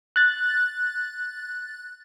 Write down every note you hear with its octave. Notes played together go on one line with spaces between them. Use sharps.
F#6 A6